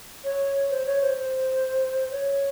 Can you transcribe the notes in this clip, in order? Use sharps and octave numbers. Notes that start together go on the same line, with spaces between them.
C#5
C5
C#5
C5
C5
C#5